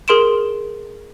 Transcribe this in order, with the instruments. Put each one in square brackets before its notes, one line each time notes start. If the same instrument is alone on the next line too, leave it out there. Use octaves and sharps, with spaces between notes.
[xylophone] G#4 A#4 C6 D7 E7